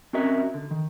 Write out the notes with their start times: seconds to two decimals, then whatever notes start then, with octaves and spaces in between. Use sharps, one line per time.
0.13 C4 C#4 F#4 A#4 D#5 E5
0.54 D3
0.71 D#3